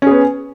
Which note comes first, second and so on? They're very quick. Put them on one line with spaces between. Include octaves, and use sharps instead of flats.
C#4 G#4 B3